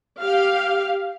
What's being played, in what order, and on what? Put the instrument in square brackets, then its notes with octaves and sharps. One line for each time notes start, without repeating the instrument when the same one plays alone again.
[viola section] G4 F5